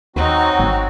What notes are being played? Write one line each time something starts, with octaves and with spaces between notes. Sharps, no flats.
D#2 F#3 C4 D#4 F#4
G#1